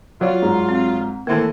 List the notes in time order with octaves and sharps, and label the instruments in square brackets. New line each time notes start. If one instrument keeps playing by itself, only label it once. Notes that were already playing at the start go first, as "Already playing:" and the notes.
[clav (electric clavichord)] F#3 D5 [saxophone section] F4 [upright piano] C#5
[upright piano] G#2 A#5
[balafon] C4
[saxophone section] A2 E3 [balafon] D#3 A#3 [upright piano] A4 A#4